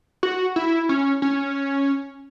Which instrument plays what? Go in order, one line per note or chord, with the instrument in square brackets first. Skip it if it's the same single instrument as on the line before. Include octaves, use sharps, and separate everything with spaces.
[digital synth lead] F#4
E4
C#4
C#4